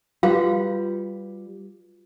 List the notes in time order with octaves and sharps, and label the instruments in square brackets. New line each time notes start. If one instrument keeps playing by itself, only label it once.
[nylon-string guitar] G3 B4 [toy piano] F4 F#4 F5